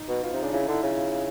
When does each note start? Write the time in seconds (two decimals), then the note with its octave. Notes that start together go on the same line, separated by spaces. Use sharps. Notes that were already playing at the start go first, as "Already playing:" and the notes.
Already playing: D#4
0.08 B2
0.23 B2 F4
0.33 C3 D#4
0.43 C#3 D4
0.53 C#3 E4
0.63 D#4
0.68 D3
0.73 E4
0.82 C#3 F4